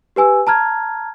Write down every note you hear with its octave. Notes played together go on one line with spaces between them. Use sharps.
G4 B4 G#5 E6
A5 A#5 F6 G#6